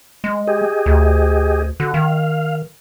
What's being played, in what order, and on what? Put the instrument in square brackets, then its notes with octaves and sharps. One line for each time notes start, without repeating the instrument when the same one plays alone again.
[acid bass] G#3
[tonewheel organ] G4 G#4 D#5
[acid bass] D2
[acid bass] D3 [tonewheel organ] F#4
[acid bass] D#3 [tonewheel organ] F5